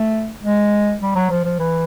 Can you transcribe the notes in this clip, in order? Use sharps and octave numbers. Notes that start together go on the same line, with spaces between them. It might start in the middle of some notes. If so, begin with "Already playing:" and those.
Already playing: A3
G#3
G3
F#3
F3
F3
E3